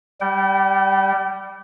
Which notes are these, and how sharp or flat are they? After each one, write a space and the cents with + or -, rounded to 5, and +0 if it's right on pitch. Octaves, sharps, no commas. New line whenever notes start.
G3 +0 G5 -40